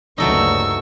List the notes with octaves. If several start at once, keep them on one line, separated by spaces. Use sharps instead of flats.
F#1 D2 G2 F#3 A3 D#4 C#6 E6